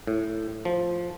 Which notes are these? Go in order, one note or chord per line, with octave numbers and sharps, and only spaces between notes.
A2
F3